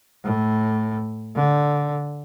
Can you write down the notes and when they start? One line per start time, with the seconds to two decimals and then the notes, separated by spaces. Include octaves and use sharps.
0.25 A2
1.36 D3